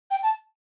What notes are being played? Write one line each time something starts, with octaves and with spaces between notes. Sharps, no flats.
G5
A5